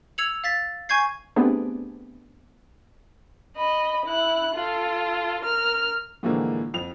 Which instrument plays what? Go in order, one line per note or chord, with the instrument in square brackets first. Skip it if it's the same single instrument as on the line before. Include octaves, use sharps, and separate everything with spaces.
[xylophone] E6 G#6 C#7 F7 F#7
F5 A6 B6
G#5 C#6 G6 G#6 C7
[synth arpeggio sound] A3 B3 C4 D4 G4 G#4
[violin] D#5 B5
E4 F#6
F4 A4
A#4 F6
[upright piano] A2 D3 E3 F3 G#3 A#3
F2 F7